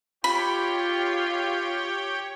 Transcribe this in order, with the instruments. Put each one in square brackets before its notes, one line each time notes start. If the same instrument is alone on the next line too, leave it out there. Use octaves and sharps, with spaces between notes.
[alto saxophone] F4 [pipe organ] G4 C#5 G5 [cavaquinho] B5